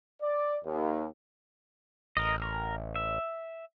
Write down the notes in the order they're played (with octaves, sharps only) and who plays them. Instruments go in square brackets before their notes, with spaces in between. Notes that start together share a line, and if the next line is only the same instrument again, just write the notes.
[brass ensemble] D5
D#2
[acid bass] A1 [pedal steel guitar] A#4 D#5
[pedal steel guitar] A#4
E5